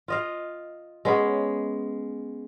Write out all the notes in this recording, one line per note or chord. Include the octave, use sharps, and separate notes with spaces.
F4 D#5 F5
G#3 B3 C#4